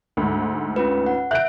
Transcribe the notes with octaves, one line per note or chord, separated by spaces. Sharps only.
D2 G#2
C#4 F4 B4
F#5
E5 F#6 G6 D7